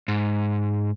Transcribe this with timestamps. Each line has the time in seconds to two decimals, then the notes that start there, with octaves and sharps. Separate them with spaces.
0.08 G#2